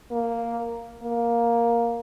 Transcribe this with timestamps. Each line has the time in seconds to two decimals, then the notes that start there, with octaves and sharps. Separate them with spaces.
0.11 A#3
1.03 A#3